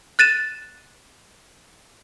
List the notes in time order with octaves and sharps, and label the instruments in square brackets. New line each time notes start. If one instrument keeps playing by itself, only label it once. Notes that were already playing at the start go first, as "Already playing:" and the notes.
[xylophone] F#6 A6 D#7 E7